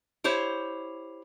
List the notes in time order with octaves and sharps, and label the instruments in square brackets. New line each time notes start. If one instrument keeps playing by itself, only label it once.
[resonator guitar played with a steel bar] E4 G4 C5 C#5